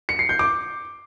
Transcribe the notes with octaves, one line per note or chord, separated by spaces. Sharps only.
C#7
C7
G6
D6